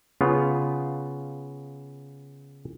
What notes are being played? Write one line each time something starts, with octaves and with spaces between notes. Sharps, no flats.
C#3 B3 F4